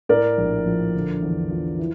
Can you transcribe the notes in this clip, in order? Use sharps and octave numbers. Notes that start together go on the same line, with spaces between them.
A2 A#4 D5
A#1
F3
D3
E2
F3
E3